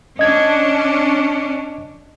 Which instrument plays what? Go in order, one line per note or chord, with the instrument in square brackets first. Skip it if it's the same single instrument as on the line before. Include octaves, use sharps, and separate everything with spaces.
[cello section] C#4 D4 [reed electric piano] D#5 G#6